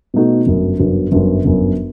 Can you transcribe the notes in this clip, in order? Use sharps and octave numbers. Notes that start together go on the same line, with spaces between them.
B2 A3 D#4 F#4
G1 F#2 F#3
G1 F#2 F#3
G1 F#2 F#3
G1 F#2 F#3